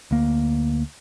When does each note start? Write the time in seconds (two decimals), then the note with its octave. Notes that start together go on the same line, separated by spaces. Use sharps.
0.11 D2 A#3